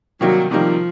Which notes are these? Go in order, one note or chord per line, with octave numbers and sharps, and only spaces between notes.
C3 D#3 F#3 G3 A#3 D#4
C3 D#3 F3 G3 A#3 D#4